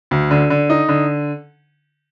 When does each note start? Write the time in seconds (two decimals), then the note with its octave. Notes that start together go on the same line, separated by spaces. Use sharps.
0.11 D2
0.31 D3
0.50 D3
0.70 D#4
0.89 D3